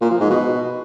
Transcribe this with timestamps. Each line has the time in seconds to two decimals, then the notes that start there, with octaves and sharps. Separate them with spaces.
0.01 A#2
0.11 F3
0.20 G#2
0.30 B2